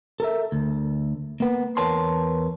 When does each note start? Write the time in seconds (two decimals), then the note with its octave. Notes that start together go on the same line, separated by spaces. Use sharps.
0.20 A4 A#4 E5
0.52 D2
1.40 A#3 B3
1.77 E2 A#4 B4 C#5 A5 C6